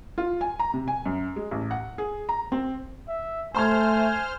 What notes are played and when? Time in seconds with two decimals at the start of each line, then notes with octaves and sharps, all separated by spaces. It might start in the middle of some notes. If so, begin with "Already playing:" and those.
0.18 F4
0.41 G#5
0.59 A#5
0.74 C3
0.88 G#5
1.06 F#2
1.36 G#3
1.51 A1
1.71 F#5
1.98 G#4
2.29 A#5
2.52 C4
3.09 E5
3.55 A3 C5 G#5 A5 C6 F6 G#6